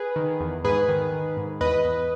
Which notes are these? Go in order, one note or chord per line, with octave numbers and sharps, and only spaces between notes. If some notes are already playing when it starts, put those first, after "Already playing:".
Already playing: G#4 B4
D#3
E2
G#2 G#4 B4
D#3
D#3
G#2
E2 B4 D#5
E2